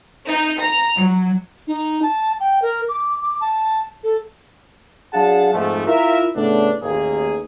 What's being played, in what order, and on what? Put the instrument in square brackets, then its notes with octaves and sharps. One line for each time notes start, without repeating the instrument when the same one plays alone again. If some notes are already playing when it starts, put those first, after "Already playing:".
[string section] D#4
A#5
F#3
[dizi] D#4
A5
G5
A#4
D6
D6
A5
A4
[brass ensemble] F#3 D4 G#4 F5 F#5 A5
F2 G#2 F3 A3
E4 F4 A#4 E5
A2 C#3 A3 B3 D4
A1 D#2 A#3 G#4